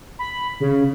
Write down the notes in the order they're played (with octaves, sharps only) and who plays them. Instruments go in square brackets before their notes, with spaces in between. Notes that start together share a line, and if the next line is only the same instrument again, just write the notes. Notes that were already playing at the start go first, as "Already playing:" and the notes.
[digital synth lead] B5
C#3